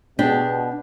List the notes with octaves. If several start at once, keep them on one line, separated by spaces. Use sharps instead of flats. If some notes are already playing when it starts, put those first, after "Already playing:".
B2 D4 G4 G#4